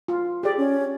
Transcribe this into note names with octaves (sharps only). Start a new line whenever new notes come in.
F4
G4 G#4 D5
C#4